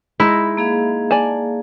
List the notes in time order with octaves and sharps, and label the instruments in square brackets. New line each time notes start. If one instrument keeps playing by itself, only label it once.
[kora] G#3 D#4 [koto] E4
[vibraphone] A#3 G#4 F5
[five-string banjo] D5 G#5 A5